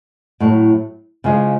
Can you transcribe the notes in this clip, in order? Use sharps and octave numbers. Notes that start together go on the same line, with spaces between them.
A2 F#3 A3
C#3 F3 G#3